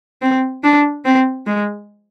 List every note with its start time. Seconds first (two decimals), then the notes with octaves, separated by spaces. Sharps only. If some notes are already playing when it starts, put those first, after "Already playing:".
0.22 C4
0.63 D4
1.05 C4
1.46 G#3